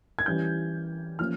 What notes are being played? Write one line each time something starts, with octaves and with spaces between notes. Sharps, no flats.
G#6
E3 G3 C#4 G6
F3 A#3 C#4 F6